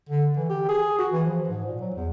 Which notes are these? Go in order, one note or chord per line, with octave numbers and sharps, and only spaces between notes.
D3
E3
G4
G#4
F#4
E3
F3
G#2
A#2
F#3
E2